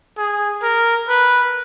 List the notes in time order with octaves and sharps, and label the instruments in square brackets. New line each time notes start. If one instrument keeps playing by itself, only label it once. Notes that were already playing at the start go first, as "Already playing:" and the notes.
[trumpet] G#4
A#4
B4